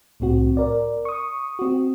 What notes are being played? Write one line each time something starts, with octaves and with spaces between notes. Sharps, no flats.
C2 A2 C4 F#4
A#4 D5
C#6 D#6
C4 F#4